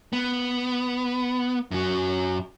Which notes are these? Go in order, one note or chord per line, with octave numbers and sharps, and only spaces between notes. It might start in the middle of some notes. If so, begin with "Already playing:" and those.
B3
F#2 F#3